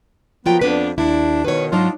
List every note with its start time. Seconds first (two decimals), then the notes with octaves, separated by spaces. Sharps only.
0.46 F3 F#3 A#3 B3 F4 G5
0.62 F2 B3 D4 B4
0.98 D#2 D4 E4
1.45 B2 D#3 B4 C#5
1.72 G#2 F#3 D4 D#4 F4